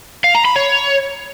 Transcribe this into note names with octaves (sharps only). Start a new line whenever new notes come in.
F5
A#5
B5
C#5